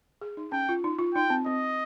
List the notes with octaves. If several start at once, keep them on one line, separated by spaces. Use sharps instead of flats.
G#4
D#4
C#4 G5
F4
D#4
F4
D#4 G5
C4
C4 D#5